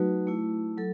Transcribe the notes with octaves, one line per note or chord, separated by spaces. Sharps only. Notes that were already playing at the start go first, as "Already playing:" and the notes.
Already playing: F#3 A3 D#4 F#4 B4
A3 E4
F#3 A4